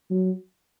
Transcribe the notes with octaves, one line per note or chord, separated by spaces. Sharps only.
F#3